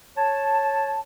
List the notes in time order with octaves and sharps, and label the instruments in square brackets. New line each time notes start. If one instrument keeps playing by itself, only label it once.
[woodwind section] C#5 A5